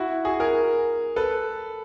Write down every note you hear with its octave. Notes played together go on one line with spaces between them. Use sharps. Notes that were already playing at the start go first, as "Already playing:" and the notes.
Already playing: E4 F#4
F#4 G#4
G#4 A#4
A4 B4